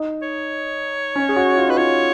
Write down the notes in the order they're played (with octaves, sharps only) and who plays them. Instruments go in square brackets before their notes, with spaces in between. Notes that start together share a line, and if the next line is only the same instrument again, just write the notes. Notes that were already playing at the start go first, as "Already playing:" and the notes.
Already playing: [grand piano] D#4
[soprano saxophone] C#5
[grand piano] C#4
G#4
F#4
F4
[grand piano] D#4 [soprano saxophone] B4
[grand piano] F4 [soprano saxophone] C#5